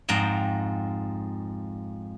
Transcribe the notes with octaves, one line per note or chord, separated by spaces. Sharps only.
F2 G#2 G5 A#5